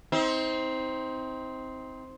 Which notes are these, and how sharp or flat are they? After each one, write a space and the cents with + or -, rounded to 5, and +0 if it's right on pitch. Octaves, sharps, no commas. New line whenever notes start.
C4 +0 D#4 +35